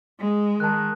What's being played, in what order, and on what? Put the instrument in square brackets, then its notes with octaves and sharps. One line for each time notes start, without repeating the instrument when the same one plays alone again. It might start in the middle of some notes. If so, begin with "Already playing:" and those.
[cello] G#3
[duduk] D#3 [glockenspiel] A5 F#6